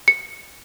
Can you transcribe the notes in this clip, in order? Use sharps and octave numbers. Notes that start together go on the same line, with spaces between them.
C#7